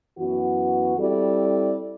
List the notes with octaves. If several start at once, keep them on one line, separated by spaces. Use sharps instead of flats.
F#2 E3 B3 F#4
G3 C4 E4 A4 D5